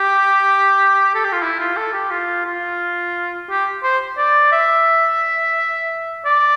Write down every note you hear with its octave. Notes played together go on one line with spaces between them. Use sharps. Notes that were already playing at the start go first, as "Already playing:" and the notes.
Already playing: G4
A4
G4
F4
E4
F4
A4
G4
F4
F4
G4
C5
D5
E5
D5